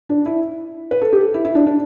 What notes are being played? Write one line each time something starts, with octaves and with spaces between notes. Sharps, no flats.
D4
E4
B4
A4
G4
E4
E4
D4
D4